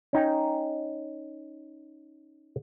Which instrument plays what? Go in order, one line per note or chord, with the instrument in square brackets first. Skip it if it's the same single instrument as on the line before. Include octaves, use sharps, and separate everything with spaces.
[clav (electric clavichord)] C#4 D#4 G5 A#5